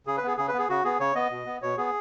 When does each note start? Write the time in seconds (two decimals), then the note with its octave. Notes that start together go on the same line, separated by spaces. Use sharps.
0.06 C#3 G#4
0.17 B4
0.23 B3 G#4
0.37 C#3 G#4
0.48 B4
0.53 B3
0.59 G#4
0.69 C#3 F#4
0.84 B3 G#4
1.00 C#3 C#5
1.15 B3 D#5
1.31 B2
1.46 B3
1.62 B2 C#5
1.77 B3 G#4